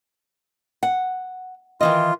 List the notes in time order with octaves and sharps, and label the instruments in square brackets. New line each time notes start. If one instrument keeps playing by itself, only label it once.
[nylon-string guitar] F#5
[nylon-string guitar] D#3 E3 D#5 [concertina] F4